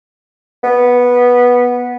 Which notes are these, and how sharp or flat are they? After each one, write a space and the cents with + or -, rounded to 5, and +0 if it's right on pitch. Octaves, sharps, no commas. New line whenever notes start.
B3 -10